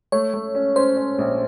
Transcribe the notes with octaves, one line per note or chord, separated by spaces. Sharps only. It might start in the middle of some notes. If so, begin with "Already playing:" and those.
A3 C#5
A3
C#4
C#4 C5
C#4
A#1